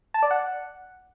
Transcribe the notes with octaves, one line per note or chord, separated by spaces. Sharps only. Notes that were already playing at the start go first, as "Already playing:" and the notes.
A5
D5
F#5